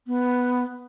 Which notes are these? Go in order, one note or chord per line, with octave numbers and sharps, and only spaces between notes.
B3